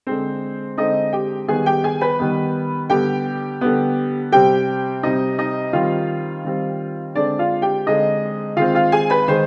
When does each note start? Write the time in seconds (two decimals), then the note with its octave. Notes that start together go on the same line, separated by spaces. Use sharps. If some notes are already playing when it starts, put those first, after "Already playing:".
0.07 D3 G#3 C4 C5
0.78 D3 G#3 C4 D#4 D#5
1.13 G4 G5
1.48 D#3 G3 B3 G#4 G#5
1.66 G4 G5
1.84 G#4 G#5
2.01 B4 B5
2.19 D#3 G3 B3
2.90 D3 G3 B3 G4 G5
3.61 D3 G3 B3
4.32 C3 G3 C4 G4 G5
5.03 C3 G3 C4 D#4 D#5
5.38 D#4 D#5
5.73 D#3 G3 C4 F4 F5
6.45 D#3 G3 C4
7.15 D3 G#3 C4 D4 D5
7.39 F4 F5
7.62 G4 G5
7.86 D3 G#3 C4 D#4 D#5
8.57 D#3 G#3 C4 F4 F5
8.74 F4 F5
8.92 G#4 G#5
9.10 B4 B5
9.28 D#3 G#3 C5 C6